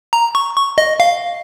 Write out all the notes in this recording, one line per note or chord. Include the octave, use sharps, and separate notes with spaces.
A#5
C#6
C#6
D#5
F5